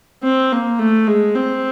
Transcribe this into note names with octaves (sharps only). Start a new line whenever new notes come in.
C4
A#3
A3
G#3
C4